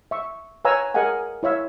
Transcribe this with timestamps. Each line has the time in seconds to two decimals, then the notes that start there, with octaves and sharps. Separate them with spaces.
0.11 E5 C#6
0.65 B4 C#5 F5 G#5 A#5 E6
0.94 G#4 A#4 D#5 F5 F#5 G#5
1.43 E4 C#5 E5 F5